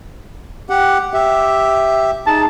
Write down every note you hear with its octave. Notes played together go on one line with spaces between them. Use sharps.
G4 F#5
G4 E5
D#4 G#4 A5